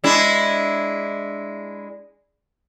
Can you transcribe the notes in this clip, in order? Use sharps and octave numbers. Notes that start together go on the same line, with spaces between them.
G#3 D4 E4